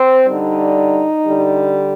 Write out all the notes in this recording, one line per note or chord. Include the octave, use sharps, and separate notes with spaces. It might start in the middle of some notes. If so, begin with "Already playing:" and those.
Already playing: C4
D3 G3 D#4
D3 G3